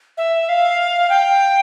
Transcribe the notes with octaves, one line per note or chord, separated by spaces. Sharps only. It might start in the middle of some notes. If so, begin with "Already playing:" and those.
E5
F5
G5